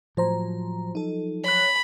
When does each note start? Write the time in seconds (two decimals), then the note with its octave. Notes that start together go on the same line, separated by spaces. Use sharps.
0.17 A2 F3 F#3 C5 A#5
0.95 D#4 A4
1.44 C#5 B5 F#6